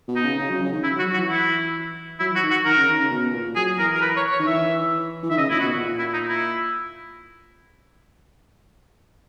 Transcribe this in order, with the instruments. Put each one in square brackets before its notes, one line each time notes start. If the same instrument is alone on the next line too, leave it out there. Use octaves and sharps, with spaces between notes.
[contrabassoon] B2
[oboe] D#4
[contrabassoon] C#3
C#3
F#3
C#3
D#3
[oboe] E4
[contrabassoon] F#3
[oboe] F#4
[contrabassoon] F#3
[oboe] F#4
[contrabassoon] E3
[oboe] E4
[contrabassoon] F#3 [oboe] E4
[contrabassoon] E3
[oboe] F#4
[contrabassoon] D#3
[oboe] F#4
[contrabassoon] D#3 [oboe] A#4
[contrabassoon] C#3
D#3
C#3
B2
A#2
[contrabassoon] F#3 [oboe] G#4
[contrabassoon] E3 [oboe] A#4
[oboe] A#4
B4
C#5
C#5
[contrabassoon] D#3
[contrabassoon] E3 [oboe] E5
[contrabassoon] E3
[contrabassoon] D#3 [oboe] E5
[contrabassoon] C#3 [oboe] D#5
[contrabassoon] A#2 [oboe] E4
[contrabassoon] B2 [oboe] F#4
[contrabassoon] A#2
[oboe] E4
D#4
E4